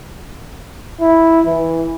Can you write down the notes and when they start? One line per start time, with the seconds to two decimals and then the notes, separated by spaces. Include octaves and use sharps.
1.01 E4
1.46 E3